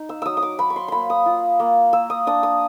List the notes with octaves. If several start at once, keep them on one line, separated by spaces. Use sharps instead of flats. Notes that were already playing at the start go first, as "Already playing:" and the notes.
Already playing: D#4
E6
F#3 D#6 E6
D#6
D6
F#3 B5
C#6
C6
A#3 B5 C6
D#6
F4
A#3
A#3 E6
D#6
D4 D#6
D#6